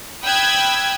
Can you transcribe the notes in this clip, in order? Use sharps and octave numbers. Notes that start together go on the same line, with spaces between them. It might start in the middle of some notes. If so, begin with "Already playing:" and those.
G5 B5 D#6 E6 F#6 G#6